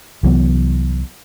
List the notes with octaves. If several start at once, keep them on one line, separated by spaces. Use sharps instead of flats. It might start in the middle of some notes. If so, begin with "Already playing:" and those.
C2 E3 F#3 B3